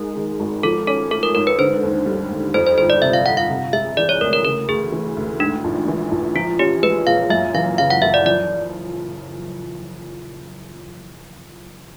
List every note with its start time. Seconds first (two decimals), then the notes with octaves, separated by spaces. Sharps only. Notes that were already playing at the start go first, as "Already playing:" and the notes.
Already playing: G#2 G#3 A#4
0.16 D#3
0.40 G#1
0.63 F3 A4
0.87 C#4 A4
1.11 A3 A4
1.23 A#4
1.35 G#2 A#4
1.47 B4
1.58 D3 C5
1.83 D#2
2.06 G3
2.30 D#2
2.54 F2 C5
2.67 C5
2.78 G1 C5
2.90 D5
3.02 C3 E5
3.13 F5
3.26 G1 F#5
3.37 F5
3.50 C3
3.73 G#3 E5
3.97 E3 D5
4.09 C#5
4.21 D2 A#4
4.33 A#4
4.44 C#3 A#4
4.68 D2 G#4
4.92 E3
5.16 D2
5.40 G#2 D4
5.64 A#1
5.88 E3
6.11 A#1
6.35 F3 F4
6.59 C#4 G4
6.83 G#3 B4
7.07 A#2 F5
7.30 F#2 E5
7.54 E3 F5
7.78 C#3 F5
7.90 F#5
8.02 F#1 E5
8.14 D5
8.26 F3 D5